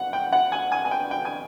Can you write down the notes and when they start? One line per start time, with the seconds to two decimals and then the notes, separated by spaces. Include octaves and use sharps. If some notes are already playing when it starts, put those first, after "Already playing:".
Already playing: F#5
0.13 G5
0.33 F#5
0.52 G#5
0.72 G#5
0.85 G#5
0.91 G5
1.11 G5
1.25 G#5